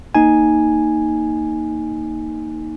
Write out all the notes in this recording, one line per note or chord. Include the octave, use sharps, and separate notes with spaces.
A#3 D#4 G#5